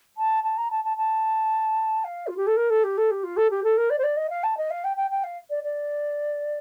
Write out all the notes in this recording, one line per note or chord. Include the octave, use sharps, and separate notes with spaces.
A5
A5
A#5
A5
A5
A5
F5
F4
G4
A4
A#4
A4
G4
A4
G4
F4
A4
G4
A4
A#4
D5
C5
D5
D#5
F5
A5
D#5
F5
G5
G5
G5
F5
D5
D5